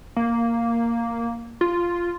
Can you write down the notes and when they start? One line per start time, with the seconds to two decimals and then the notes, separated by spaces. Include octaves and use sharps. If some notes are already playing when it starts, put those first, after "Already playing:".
0.16 A#3
1.61 F4